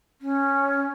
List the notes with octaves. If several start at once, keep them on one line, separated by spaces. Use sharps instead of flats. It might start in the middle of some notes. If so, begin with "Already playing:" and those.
C#4